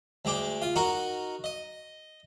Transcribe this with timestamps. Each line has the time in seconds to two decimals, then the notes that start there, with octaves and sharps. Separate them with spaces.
0.25 D2 G#3 G5 D6
0.62 F4
0.76 D#4 F#4 A#4 C#6
1.44 D#5